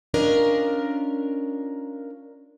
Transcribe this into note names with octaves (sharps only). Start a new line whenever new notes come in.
C#4 D4 F4 A#4 D#5